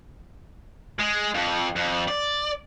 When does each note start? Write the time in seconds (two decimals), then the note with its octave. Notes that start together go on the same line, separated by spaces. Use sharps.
1.00 G#3
1.35 F2
1.76 F2
2.08 D5